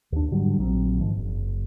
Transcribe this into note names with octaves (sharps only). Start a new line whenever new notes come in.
D#2 D4
G#2 D3 F#3 G3
A#1 F#3 C4
G#2 D#3 F3
F#1